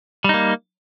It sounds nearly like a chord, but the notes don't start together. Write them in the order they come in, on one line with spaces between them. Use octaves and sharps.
G3 D#4 A#3